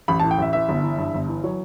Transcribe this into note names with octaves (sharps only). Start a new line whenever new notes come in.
A1 B5
A5
A2
G5
A1 E5
E3 E5
G1
E3
G2
G1
E3
F#3 C#5